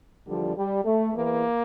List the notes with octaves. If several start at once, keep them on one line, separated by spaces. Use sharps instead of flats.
E2 D3 F3 G3
G3
A3
E2 E3 A#3